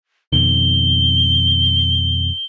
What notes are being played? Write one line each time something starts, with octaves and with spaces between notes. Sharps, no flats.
F2 B2 D#3 G7